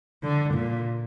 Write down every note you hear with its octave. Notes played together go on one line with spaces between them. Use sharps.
D3
A#2